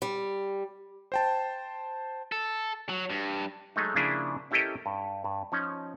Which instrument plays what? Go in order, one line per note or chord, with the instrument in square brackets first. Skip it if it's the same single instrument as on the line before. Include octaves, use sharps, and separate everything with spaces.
[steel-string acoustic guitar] G3
[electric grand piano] C5 G5 A5
[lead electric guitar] A4
F#3
G2
[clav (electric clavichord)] F#3 G#3 A3 D#4
C#3 F3 A#3 D4 E4 G#4
C#4 E4 G4 A4 A#4 D#5
G2
G2
F3 C#4 D#4